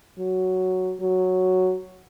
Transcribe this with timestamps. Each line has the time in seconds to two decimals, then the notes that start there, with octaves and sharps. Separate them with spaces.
0.18 F#3
1.01 F#3